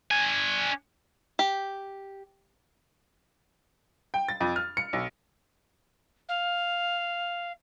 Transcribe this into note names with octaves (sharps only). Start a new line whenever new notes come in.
D4 G#5
G4
G5
A6
F2
F6
C#7
B1
F5